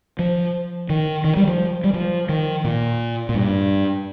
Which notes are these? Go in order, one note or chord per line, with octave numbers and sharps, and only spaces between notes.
F3
D#3
D#3
G3
F3
G3
F3
D#3
A#2
A#2
G2